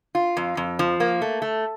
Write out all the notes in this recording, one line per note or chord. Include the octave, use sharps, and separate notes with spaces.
F4
F2
F2
F3
A#3
A3
A3